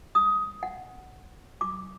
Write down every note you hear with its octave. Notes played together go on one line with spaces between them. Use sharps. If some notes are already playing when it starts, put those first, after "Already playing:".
D#6
F#5
D6